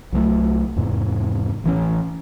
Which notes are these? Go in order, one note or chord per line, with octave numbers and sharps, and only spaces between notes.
C2 F#3 G#3 A3
E2 G#2 C3
A1 E3 F3 C#4